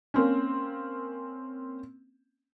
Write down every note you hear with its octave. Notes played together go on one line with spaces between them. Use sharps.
A#3 C4 C#4